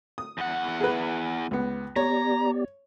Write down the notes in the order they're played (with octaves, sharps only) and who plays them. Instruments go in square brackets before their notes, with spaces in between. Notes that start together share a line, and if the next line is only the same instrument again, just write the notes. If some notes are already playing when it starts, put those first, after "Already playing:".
[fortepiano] D#6
[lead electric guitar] E2 F#5
[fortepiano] G#4 B4
C#2 B3
[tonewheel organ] B3 G4 D5 [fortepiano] C#5 [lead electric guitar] A#5